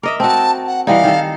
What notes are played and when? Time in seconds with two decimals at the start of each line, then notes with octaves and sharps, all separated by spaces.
0.03 A#4 D#5 E5 D6
0.20 C4 F#4 A5
0.67 F#5
0.87 E3 G3 D#4 F5
1.04 D#3 A4